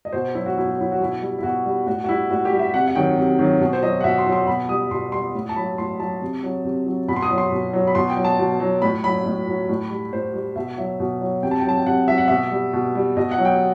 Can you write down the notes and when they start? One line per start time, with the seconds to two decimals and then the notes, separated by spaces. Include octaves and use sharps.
0.05 D#5
0.12 B2 C5
0.35 F#3 E4
0.46 F#4
0.56 B2 E4
0.69 F#4
0.78 F#3 E4
0.92 F#4
1.00 B2 E4
1.22 G3
1.38 E4
1.43 B2 F#4
1.65 G3
1.86 A2 F#4
2.04 F#4
2.08 G3 E4
2.30 A2 F#4
2.45 G4
2.52 G3
2.59 E5
2.74 C3 F#5
2.88 F#5
2.96 D#3 F#3 G5
3.18 C3
3.39 D#3 F#3
3.61 B2
3.73 C5
3.82 F#3 D#5
4.01 F#5
4.04 B2 E5
4.18 C6
4.26 F#3
4.32 C6
4.47 B2 B5
4.69 G3 D#6
4.91 B2 C6
5.12 G3 C6
5.35 A2
5.49 A5
5.56 F#3 B5
5.78 A2 C6
6.00 F#3 A5
6.21 C3
6.43 F#3
6.65 C3
6.86 F#3
7.08 B2 B5
7.16 C6
7.23 D#6
7.30 F#3
7.38 C6
7.52 B2
7.73 F#3
7.87 B5
7.95 B2 C6
8.10 G5
8.17 F#3
8.25 A5
8.39 B2
8.60 F#3
8.82 A2 B5
9.04 F#3 B5
9.26 A2
9.47 F#3
9.69 A2
9.90 G3
10.13 A2 C5
10.34 G3
10.56 B2 E5
10.78 F#3 E5
11.00 B2
11.21 F#3
11.43 C3 G5
11.51 A5
11.60 G5
11.64 F#3 A5
11.77 G5
11.86 C3 F#5
12.08 F#3 E5
12.18 F#5
12.28 B2 E5
12.52 G3
12.73 B2
12.95 G3
13.17 B2 D#5
13.31 F#5
13.38 F#3
13.45 G5